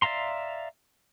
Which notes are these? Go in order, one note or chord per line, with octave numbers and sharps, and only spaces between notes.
D5 E5 F5 A#5 C6